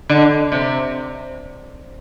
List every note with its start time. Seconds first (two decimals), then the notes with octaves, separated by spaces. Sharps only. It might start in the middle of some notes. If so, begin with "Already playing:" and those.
0.09 D3
0.52 C3